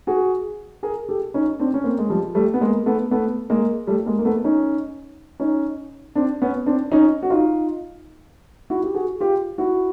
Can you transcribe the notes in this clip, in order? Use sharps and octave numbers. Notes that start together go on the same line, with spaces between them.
F#4 G#4
G#4 A#4
G4 A4
C#4 D#4
C4 D4
C#4
A#3 C4
G#3
F3 G3
G3 A3
B3
G#3 A#3
A3 B3
A3 B3
G#3 A#3
G3 A3
G#3 A#3
A#3
A3 B3
C#4 D#4
C#4 D#4
C4 D4
B3 C#4
C4 D4
C#4 D#4
F#4
D#4 F4
E4 F#4
G4
F#4 G#4
F4 G4
E4 F#4